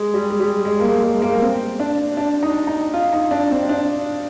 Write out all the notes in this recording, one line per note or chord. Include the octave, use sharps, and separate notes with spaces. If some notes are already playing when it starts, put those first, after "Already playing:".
Already playing: G#3
G3
G#3
G3
G#3
A#3
G#3
G#3
A#3
A#3
C4
D4
D4
D#4
D#4
F4
D#4
D4
C4
D4